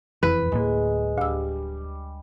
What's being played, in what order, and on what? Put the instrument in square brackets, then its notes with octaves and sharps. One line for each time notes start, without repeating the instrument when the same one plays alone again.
[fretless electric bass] E1 F2 E3 [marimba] E4 [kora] B4
[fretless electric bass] D1 A2 A#3 [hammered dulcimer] G#3
[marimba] D2 E6 [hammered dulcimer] G3